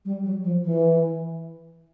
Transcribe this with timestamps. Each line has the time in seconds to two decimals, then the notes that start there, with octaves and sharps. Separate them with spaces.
0.05 G3
0.24 F#3
0.44 F3
0.64 E3